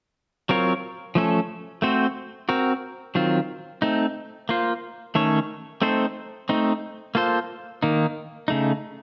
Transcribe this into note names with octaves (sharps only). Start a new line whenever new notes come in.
F#3 C4 F4 A#4 C#5
F3 A3 C#4 A4
A3 C4 F#4 C5
C4 F#4 A#4
D#3 F#3 C4 F4
A3 C4 D#4
A#3 F4 C5
D#3 A3 C#4 A4 C#5
A3 C4 D#4 A4 C5
A3 C4 D#4
A#3 F4 A4 C5
D#3 A#3 D#4
C#3 A3 D#4